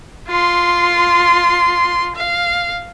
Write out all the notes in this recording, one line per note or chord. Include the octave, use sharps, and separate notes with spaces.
F4 C6
F5